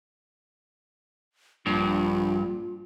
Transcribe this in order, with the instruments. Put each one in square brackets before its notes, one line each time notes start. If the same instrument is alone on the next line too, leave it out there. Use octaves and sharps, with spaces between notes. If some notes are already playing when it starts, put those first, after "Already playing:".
[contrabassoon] A#1 [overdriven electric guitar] G2 [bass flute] F4